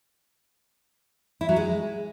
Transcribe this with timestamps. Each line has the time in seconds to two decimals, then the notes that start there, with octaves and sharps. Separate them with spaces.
1.41 E4
1.49 F#3
1.56 G#3